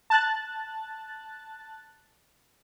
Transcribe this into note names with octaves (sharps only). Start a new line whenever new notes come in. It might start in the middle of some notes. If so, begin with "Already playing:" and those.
A5 F#6 A6